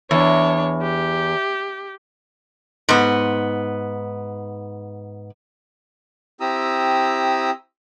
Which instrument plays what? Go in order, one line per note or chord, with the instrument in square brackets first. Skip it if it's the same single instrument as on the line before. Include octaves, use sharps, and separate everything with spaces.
[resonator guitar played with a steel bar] E2 [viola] D4 C#5
[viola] G4
[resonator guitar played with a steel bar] G#2 B3
[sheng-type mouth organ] C4 E4 G4 A#5 D#6 E6